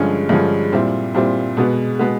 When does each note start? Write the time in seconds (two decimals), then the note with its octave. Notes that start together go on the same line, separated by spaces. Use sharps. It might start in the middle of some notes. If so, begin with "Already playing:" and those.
Already playing: G2 D3 F3 G#3 C#4
0.29 G2 D3 F3 G#3 C#4
0.72 A#2 G3 C4 E4
1.14 A#2 G3 C4 E4
1.57 B2 G#3 B3
1.99 B2 G#3 B3